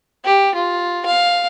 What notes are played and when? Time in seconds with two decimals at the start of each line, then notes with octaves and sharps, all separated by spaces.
0.25 G4
0.55 F4
1.06 F5